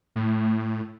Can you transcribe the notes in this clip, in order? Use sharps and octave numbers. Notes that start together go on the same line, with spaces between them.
A2